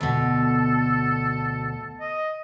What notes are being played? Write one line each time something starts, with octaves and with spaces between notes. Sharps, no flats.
D2 B2 A4
D#5